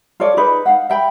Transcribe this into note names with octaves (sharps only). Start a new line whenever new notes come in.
F4 A4 C#5 D5
D#4 G#4 B4
D#4 F5 F#5
E5 G5 B5